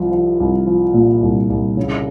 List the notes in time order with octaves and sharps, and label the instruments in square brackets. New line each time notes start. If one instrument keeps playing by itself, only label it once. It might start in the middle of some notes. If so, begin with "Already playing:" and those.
Already playing: [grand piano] C2 F3
F3
C2
F3
A#2
C2
C2
C#3